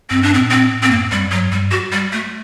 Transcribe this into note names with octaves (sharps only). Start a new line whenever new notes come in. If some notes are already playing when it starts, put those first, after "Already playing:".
G2 C4
D4
C4
A#2
C4
A2
C4
F#2 A#3
F#2 G3
G2 F#3
G2 G3
F#4
G3
A3